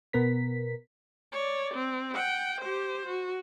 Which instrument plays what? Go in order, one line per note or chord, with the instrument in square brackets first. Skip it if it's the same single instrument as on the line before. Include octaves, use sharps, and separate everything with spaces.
[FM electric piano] B2 B3 A#4 B6
[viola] C#5 D5
C4
F#5 G5
G4 C5
F#4